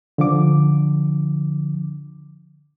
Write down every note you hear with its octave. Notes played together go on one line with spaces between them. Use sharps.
D3 F3 D6